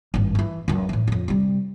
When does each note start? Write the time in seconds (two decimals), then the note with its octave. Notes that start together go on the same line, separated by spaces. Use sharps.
0.14 G#1 G2
0.35 D#3 E3
0.68 C#2 F#2
0.89 A2 E3
1.07 F2 C#3
1.28 C3 G3